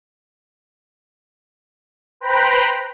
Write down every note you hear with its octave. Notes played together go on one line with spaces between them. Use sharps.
B4 C5 G5 A#5 B5